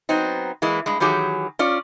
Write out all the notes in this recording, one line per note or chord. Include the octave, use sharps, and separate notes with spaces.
F#3 B3 C4 D#4
E3 G#3 A#3 E4
G2 G#3
D#3 E3 F#3 G4 G#4
C#4 F4 D5